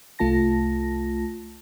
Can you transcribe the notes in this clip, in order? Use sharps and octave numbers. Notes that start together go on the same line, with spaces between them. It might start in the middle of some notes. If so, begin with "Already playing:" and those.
C2 A3 F4 A5 A#6